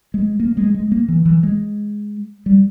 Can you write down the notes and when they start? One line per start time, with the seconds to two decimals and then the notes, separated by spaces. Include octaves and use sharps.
0.14 G#3
0.40 A#3
0.57 G#3
0.74 G#3
0.92 A#3
1.08 E3
1.25 E3
1.43 G#3
2.46 G3